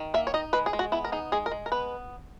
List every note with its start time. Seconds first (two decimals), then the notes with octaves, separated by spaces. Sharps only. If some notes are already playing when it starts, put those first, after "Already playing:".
Already playing: D#3
0.14 A#3 E5
0.27 C#5
0.34 D#4 D#5
0.53 G#3 B4
0.66 G#4
0.73 G#3
0.79 F#4
0.92 B3 E4
1.04 A#4
1.12 D#4 G#4
1.32 G#3 G#4
1.46 A#4
1.51 G#3
1.66 A#4
1.72 B3 B4